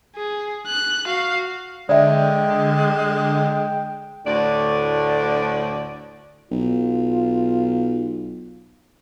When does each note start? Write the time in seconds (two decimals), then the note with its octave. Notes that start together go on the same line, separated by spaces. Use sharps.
0.16 G#4
0.67 F#6
1.06 F#4 F5
1.89 D3 G#3 D5 E5 G5
4.25 D2 A2 D3 D5
6.51 B1 F4